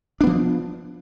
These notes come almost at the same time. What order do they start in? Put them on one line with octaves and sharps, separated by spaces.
D4 B3 F3